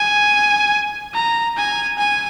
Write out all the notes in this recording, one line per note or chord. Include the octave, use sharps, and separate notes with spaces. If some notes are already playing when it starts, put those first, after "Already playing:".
Already playing: G#5
A#5
G#5
G#5